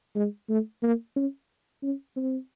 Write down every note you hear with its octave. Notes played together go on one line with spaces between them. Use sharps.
G#3
A3
A#3
C#4
C#4
C4